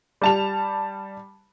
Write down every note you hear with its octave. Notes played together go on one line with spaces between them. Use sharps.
G3 A5 F7